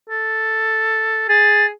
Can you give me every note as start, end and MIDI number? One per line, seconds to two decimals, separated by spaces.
0.10 1.27 69
1.29 1.70 68
1.29 1.66 93